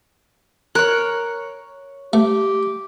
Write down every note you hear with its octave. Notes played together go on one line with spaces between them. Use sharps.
A#4 C#5 F#6
A3 G4